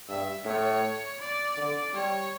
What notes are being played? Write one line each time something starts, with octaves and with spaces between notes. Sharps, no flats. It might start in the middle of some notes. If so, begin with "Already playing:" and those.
G2 E5
A2 C#5
D5
D3
G3 C#5